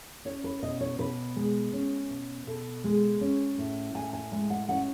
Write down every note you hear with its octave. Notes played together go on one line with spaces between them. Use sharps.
C#4 C#5
B4
B2 D#5
C#5
B2 B4
G#3
C#4
B2
B2 A4
G#3
C#4
A2
A2 G#5
G#5
G#3 G#5
F#5
C#4 F#5